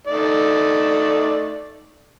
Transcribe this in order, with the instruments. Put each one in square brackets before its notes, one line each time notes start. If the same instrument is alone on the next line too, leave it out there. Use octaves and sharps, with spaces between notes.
[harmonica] A3 D#4 D5